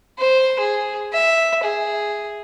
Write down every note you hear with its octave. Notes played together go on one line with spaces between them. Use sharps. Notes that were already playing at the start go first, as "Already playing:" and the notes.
C5
G#4
E5
G#4